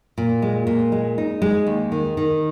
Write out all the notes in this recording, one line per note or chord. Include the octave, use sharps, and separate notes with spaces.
A#2
G#3
A#2
G#3
D#4
G#3
D#2
D#3
D#3